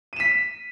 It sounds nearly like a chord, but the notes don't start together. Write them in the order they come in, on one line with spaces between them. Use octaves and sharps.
D#7 E7 B6